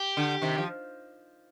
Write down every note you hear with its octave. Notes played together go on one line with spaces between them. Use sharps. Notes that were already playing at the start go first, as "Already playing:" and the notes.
Already playing: G4
D3
C3 D#3
F3